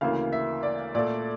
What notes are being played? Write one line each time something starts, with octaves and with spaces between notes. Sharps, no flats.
D2 C#3 E3 A#3 F5
E5
D5
A#2 A3 D5